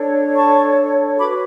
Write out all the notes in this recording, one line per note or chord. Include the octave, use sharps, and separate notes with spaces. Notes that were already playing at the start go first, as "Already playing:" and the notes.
Already playing: D4 A4 C#5
A5 C#6
F#4 B4 B5 D6